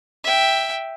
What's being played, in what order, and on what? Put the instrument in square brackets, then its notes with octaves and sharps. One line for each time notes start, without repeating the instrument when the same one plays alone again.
[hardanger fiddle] E5 G5